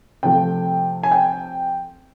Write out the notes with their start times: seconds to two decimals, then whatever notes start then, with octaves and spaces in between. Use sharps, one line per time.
0.23 C3 F3 A3 G5
1.03 G#5
1.12 G5